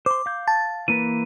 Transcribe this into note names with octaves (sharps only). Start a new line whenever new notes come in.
C5 C6 D6
F5 G6
A5 A6
E3 A#3 B4 D#7